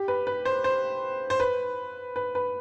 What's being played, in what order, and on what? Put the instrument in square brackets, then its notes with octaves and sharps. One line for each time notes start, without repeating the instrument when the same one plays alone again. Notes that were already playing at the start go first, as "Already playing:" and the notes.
Already playing: [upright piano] G4
B4
B4
C5
C5
C5
B4
B4
B4